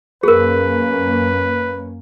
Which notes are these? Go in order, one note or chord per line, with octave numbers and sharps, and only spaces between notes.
F#2 A#3 C#4 G#4 A#4 B4